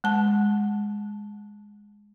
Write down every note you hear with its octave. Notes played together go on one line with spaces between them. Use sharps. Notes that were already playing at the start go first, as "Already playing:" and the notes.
G#3 A5